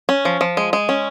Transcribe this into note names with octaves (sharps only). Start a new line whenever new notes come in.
C#4
F3
F3
G#3
G#3
C#4